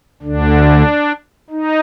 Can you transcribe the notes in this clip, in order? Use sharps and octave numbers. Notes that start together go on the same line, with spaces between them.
D2 D3 D4
D#4